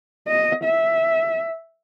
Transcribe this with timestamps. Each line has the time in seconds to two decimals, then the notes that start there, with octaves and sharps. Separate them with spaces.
0.28 D#5
0.63 E5